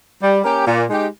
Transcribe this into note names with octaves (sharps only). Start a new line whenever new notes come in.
G3
A#3 C#4 G4
A#2
G#3 D#4 G4